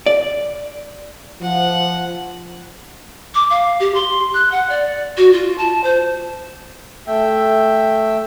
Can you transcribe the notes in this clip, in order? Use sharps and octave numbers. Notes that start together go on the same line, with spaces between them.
D5
F3 F#5
D6
F5
G4
C6
F#6
F#5
D5
F#4
F4
A5
C5
A3 E5 G5